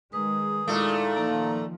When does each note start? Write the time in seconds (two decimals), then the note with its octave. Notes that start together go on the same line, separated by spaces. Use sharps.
0.13 D#3 G#3 G#4 B4 A#5
0.68 A#2 G#3 A3 D#4 E4 D6
1.16 D#3 F3 A#3 D#4 A5 A#5